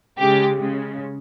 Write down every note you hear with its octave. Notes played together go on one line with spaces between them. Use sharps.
C#3 G#3 G4
C#3 G#3